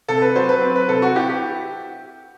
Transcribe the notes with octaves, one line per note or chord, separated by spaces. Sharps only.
C3 A4
B4
F#3 C5
B4
C4
B4
C3 A4
F#4
E4 G4
G4